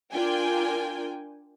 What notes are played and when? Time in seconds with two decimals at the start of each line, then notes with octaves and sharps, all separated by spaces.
0.12 D4 F4 A#4 G5 G#5